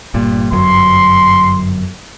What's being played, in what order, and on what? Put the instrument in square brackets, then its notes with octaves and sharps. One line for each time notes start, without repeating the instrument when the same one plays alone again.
[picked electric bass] G1 G2 A#2
[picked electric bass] G1 F#2 F#3 [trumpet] C6